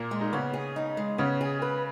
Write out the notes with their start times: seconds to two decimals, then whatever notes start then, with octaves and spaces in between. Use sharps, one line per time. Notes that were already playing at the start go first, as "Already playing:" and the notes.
Already playing: A#2 A#3
0.11 G#3
0.21 D#4
0.33 C#3 B3 C#4
0.53 G#4
0.76 D#4
0.97 G#3
1.18 C#3 B3 C#4
1.41 G#4
1.62 B4